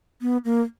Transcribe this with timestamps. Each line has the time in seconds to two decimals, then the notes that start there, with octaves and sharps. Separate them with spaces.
0.21 B3
0.45 A#3